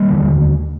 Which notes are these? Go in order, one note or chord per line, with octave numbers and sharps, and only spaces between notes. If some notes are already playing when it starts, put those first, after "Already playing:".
Already playing: G3 A#3
D#2 D3